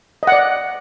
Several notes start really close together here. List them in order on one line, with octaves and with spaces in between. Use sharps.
D#5 F#5 D5